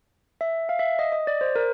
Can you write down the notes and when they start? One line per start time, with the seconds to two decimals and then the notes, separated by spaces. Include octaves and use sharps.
0.41 E5
0.69 F5
0.79 E5
0.99 D#5
1.12 D#5
1.27 D5
1.41 C5
1.56 A#4